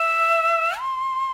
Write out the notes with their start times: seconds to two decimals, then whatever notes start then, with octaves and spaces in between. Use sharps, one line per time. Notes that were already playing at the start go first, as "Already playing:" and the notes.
Already playing: E5
0.79 C6